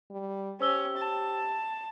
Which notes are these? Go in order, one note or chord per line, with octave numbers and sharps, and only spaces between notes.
G3
C#4 G4 C5 E6 G7
A5